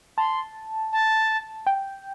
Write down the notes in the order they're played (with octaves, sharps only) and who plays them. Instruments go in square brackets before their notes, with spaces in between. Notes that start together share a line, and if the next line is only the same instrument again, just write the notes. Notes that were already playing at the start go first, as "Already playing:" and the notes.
[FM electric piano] A5 [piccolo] C6
[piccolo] A5
[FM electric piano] G5